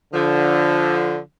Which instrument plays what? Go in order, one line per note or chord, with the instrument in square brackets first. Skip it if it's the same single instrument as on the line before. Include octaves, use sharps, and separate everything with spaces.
[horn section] D3 F3